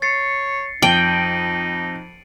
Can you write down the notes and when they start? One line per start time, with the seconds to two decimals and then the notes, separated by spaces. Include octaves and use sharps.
0.02 C#5 A6 C7 C#7
0.82 F2 D#4 G5 D7 D#7 F#7